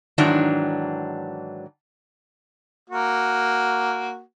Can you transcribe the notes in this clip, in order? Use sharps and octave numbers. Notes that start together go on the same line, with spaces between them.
G#2 D#3 E3 F#3 D4
A#3 F#4